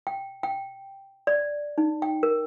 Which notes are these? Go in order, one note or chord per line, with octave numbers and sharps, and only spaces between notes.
G5
G5
D5
D#4
G5
A#4